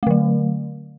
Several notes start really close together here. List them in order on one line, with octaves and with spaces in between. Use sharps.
A3 D3 F#3